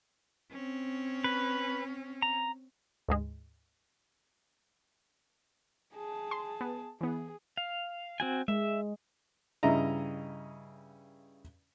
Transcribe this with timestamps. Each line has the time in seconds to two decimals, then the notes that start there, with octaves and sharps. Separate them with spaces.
0.51 C4 C#4
1.24 B4
2.22 A#5
3.08 D2 G#2 G#3
5.95 G#4 A5
6.31 C6
6.61 B3
7.01 E3 B3 G#4
7.57 F5
8.20 C4 F#4 G#5
8.48 G#3 E5
9.63 G2 C#3 E4 D#5 A#5